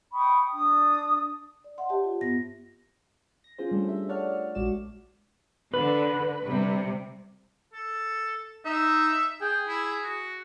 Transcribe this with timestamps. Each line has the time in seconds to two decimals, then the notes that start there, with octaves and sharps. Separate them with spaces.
0.13 G5 B5 C#6 D#6
0.51 D4 D#6
1.64 D5
1.78 D#5 E5 F#5 C6
1.89 G4 C5 C#5 D#5 E5 A5
2.04 F4
2.21 G2 B3 A#6
3.44 A#6
3.58 C#4 F4 G#4 C5
3.71 G3 A3 D4 G4 A4
3.85 C5 E5
4.09 C#5 D5 F#5 A5 C#6 F6
4.55 A#1 G#3 F#4 D5 E7
5.74 D3 B4
6.44 C3 G3
7.73 A4
8.65 D#4 E5
9.41 G#4 G5
9.68 E4
10.04 F#4